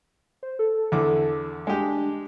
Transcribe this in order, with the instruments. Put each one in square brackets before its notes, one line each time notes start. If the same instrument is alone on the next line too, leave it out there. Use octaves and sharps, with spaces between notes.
[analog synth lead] C5
A4
[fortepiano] E2 D3 D6
[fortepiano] G#3 G4 [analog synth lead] D4